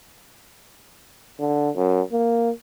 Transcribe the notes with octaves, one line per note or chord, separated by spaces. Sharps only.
D3
F#2
A#3